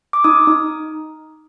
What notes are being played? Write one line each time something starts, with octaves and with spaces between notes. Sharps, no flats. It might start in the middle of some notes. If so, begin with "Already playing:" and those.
D6
D#4 D#6
D#4